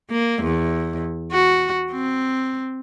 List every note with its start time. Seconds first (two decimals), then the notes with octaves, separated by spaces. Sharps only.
0.11 A#3
0.43 E2
1.32 F#4
1.91 C4